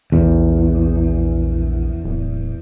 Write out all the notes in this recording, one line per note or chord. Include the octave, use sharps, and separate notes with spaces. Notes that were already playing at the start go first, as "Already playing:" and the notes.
A#1 E2
D1